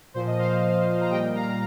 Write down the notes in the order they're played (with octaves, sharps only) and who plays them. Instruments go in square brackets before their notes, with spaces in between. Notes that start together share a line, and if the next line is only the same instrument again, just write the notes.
[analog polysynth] A#2 F3 C5
D#5
C5 F5
A#5
A#2 G3 D#5 G5
F5 A#5